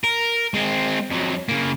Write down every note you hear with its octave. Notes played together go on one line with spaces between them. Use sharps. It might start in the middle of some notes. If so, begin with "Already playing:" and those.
A#4
G#3 C4
F2 F#3
C#3 A#3